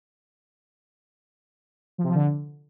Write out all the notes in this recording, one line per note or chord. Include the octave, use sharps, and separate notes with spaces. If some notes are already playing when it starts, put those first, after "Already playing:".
F3
C3
F3
D3